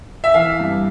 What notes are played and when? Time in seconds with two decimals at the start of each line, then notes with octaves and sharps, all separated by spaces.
0.24 E5
0.34 E3 F5
0.60 G2